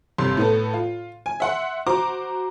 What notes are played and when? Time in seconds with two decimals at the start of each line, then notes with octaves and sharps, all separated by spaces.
0.18 G1 C3 C6
0.37 A2 B3 A4
0.73 F4
1.26 G#5
1.40 E5 F#5 C6
1.87 F#4 C5 A#5 D6